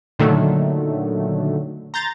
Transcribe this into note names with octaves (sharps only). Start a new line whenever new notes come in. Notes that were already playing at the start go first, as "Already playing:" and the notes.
A#2 D3 D#3 F#3 A3
A#5 C6 G6 A6 A#6